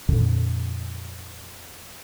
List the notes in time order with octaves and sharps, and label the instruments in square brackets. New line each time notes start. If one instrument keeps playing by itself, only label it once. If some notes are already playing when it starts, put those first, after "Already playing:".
[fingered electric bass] F2 A#2 D3